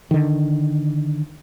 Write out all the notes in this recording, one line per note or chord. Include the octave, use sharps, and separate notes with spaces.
D3 D#3